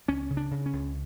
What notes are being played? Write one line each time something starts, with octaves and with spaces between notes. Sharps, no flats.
C#2 C#4
C#3
D4
C#3
C#4
C#2